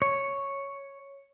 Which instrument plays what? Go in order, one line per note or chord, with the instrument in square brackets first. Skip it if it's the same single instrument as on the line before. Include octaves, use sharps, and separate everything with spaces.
[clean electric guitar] C#5